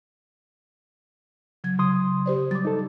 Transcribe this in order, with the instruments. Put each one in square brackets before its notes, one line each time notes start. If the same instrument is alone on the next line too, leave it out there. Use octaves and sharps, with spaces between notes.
[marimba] C#3 F#3 G#6
[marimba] C#3 [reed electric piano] F#3 C6 D#6
[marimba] G4 C5 D5
[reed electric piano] F#3 G3 [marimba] D6 A6
[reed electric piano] D#4 A4